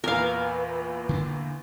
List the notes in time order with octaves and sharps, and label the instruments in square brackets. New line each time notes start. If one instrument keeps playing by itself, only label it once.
[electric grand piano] E2 A#2 E3 [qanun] A#4 F5 [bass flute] B4
[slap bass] D3 C#4 D4